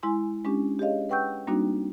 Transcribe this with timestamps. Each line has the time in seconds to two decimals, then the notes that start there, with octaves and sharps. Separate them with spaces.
0.03 G#3 E4 G#5 C6
0.44 G#3 C#4 D4 G4
0.79 G4 G#4 C#5 D#5 F5
1.09 B4 F#5 G5 C#6 E6 G6
1.47 G3 A#3 C4 D4 D#4 F#4